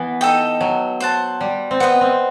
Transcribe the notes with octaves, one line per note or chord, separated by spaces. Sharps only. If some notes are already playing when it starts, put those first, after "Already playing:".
Already playing: E3 B3
D#4 A4 D#5 G5
F#3
C5 F#5 A5
G3
C4
B3 B4 D#5 F#5
C4